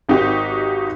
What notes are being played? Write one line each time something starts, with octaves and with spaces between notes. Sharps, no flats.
G#1 D#4 F#4 G4